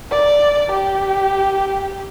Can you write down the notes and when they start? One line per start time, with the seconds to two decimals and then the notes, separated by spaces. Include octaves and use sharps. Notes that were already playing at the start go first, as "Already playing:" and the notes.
0.11 D5
0.72 G4